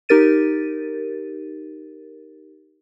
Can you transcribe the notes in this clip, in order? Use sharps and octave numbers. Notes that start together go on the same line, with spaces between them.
D#4 G4 A#4 A6 D#7